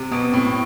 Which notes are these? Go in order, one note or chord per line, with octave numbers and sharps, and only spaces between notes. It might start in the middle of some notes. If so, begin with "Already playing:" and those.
Already playing: C3
B2 B3
A2 C4